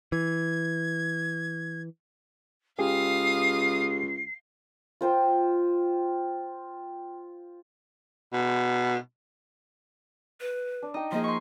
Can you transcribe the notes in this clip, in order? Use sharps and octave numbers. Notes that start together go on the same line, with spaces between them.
E3 G#6
C#2 G4 G#4 F5 D#6 C7
F4 C5 G5
B2
B4
D4
D#4 D#5 G5
F3 A#3 G#4 D#5
C6 C#6